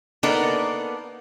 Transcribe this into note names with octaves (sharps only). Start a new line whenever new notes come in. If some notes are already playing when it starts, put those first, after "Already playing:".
A#3 B3 D4 D#4 A4 A#4